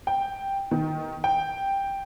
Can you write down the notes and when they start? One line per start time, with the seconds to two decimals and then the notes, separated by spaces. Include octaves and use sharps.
0.07 G5
0.71 D#3
1.24 G5